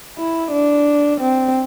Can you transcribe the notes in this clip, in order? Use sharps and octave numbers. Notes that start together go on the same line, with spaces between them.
E4
D4
C4